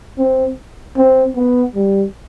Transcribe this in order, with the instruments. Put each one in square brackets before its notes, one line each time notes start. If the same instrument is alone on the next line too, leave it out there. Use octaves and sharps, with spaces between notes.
[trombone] C4
C4
B3
G3